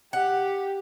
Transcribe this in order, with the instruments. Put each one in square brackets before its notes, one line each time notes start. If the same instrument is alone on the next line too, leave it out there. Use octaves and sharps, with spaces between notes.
[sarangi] G4 [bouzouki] F#5